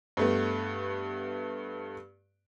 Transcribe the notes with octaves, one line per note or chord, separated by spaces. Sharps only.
G2 A3 B3